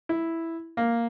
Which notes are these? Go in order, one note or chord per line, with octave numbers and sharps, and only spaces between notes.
E4
A#3